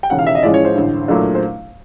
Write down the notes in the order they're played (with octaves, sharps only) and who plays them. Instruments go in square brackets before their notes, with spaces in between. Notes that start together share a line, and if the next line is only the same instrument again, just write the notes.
[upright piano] G5
E1 D#2 C#3 F#5
F5
E5
D#5
A1 A2 F3 G#3 C#4 D5
C#5
C5
A1 G2 D3
A#2 F#3 A3 D4
C5